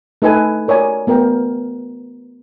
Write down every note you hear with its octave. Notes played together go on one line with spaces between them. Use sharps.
A3 D#4 A4 B4 G#5
A#4 C#5 D5 G#5
A3 B3 A#4 G5